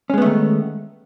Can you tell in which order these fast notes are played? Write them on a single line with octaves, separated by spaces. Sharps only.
C#4 G#3 B3 A3 D#3